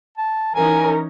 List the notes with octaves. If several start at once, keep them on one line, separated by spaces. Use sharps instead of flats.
A5
E3 C#4 D#4 A#4 G#5